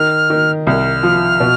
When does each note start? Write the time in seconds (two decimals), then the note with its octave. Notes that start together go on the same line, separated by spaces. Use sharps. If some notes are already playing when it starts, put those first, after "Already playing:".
Already playing: D#3 F6
0.30 D#3
0.67 C2 F6
1.03 F3
1.40 B2